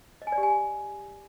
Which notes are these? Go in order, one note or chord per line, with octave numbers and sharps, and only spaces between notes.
D#5
G#5
D5
G4
G#5